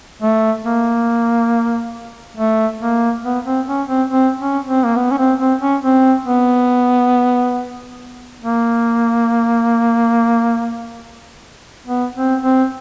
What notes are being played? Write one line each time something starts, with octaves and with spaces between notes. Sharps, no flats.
A3
A#3
A3
A#3
B3
C4
C#4
C4
C4
C#4
C4
A#3
B3
C#4
C4
C4
C#4
C4
B3
A#3
B3
C4
C4